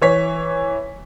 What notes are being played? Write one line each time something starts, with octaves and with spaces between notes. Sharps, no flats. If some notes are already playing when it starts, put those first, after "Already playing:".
E3 C#5 B6